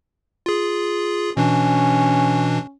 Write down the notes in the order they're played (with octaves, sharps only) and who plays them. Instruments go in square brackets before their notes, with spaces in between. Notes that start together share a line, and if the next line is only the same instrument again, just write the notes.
[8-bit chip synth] F4 G#4
[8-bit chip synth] B2 E3 D4 [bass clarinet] C#4